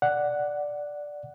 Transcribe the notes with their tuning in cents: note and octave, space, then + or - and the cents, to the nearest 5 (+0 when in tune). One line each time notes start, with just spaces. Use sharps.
D5 +0 F#5 +0